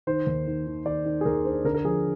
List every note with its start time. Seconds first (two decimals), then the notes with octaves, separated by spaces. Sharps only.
0.07 D#3 C5
0.27 D#2
0.47 D#3
0.67 D#3
0.86 D#3 D5
1.05 D#3
1.21 G#4
1.25 D#2 A#4
1.45 D4 C5
1.64 D3 A#4
1.74 A#4
1.84 F3 G#4